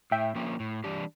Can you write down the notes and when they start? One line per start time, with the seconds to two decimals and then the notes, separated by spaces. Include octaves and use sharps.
0.11 A2 E5 G5
0.35 F3 A#3 C#4
0.60 A2
0.84 E3 G3 D4 G4